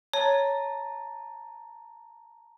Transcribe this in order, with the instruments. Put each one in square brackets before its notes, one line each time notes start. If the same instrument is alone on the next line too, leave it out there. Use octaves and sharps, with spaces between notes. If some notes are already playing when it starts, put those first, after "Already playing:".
[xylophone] C#5 [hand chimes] A5 A#5